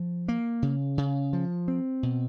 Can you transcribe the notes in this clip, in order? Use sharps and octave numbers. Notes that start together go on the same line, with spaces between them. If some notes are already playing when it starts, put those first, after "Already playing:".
Already playing: F3
A#3
C#3
C#3
F3
C4
B2